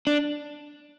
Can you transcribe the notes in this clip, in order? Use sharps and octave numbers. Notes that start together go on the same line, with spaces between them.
D4